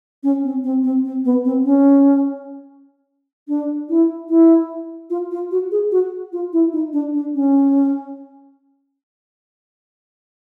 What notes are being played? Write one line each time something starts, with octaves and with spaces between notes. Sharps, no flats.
C#4
C4
C4
C4
C4
B3
C4
C#4
D4
E4
E4
F4
F4
F#4
G#4
F#4
F4
E4
D#4
D4
D4
C#4